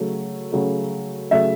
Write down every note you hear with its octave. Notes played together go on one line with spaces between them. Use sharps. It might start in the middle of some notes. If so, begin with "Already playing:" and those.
Already playing: C#3 F#3 A3
C#3 F#3 A3
C#3 F#3 A3 E5